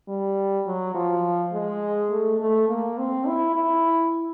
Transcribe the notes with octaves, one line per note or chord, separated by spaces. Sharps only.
G3
F#3
F3
G#3
A3
A3
A#3
C4
E4
E4